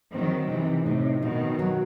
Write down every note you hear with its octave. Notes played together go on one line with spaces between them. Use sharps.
D#3 F#3 C4
C3 E3 D#4
A2 C3 D#4
B2 D#3 D#4
F#3